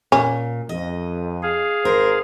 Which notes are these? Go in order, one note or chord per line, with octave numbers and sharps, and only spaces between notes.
A#2 C#4
F2 D#5
G#4 F5
G#1 A#4 C5